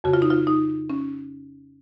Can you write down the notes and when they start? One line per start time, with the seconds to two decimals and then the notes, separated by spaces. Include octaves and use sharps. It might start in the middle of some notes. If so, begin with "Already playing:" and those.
0.04 F2 C#3 F#4
0.13 F4
0.22 D#4
0.30 F4
0.47 D#4
0.90 C#4